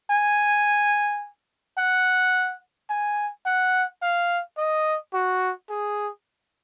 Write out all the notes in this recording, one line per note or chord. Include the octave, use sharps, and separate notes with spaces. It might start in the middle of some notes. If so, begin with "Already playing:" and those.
G#5
F#5
G#5
F#5
F5
D#5
F#4
G#4